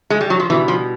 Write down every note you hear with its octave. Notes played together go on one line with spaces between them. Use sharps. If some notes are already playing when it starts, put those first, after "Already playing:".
G#3
G3
F#3
F3
B2 E3 G3 B3 E4
F3